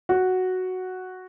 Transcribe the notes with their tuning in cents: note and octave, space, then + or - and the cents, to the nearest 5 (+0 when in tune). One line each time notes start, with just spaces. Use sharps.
F#4 +0